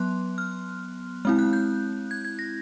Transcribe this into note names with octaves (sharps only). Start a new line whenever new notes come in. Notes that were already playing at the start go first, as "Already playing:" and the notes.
Already playing: F#3 B3 C6 F#6
F6
G#3 C4 E4 F6
F#6
G6
G#6
G#6
A#6